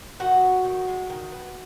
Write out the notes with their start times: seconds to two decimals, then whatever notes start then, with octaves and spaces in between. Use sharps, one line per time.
0.20 D#3 F#4 F#5
0.43 B3
0.65 D#3
0.88 G#3
1.10 D#3
1.32 B3